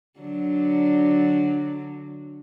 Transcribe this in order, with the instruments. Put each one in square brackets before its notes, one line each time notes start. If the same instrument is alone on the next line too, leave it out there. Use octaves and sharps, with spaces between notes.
[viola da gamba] D3 F#3 D4